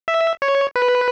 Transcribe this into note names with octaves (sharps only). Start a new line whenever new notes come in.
E5
C#5
B4